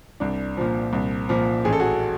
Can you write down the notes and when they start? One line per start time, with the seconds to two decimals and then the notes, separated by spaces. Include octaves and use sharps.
0.20 C2 D4
0.57 A#2 F3
0.93 C2
1.29 A#2 F3
1.65 A1 G#4
1.73 A4
1.80 F#4 G#4